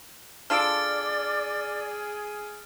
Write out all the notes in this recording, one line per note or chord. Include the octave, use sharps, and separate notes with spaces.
D4 F4 G#4 A4 D5 F6 A6 D7